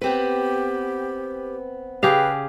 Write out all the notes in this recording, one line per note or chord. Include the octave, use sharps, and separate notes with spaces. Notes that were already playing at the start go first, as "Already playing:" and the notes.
B3 C4 G4 B4
C#3 G4 G#4 B4 F5